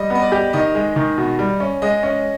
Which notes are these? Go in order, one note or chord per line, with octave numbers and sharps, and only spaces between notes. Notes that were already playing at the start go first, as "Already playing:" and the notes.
Already playing: G3 D#5
B3 D#5
D5
G4
D#3 D#5
G#3
D#3
B2
G3
C#4
G#3 D#5
C#4